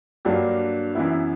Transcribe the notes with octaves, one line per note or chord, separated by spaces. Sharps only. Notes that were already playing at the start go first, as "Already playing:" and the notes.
G2 F#3 A#3 D4 G4
F#2 E3 B3 E4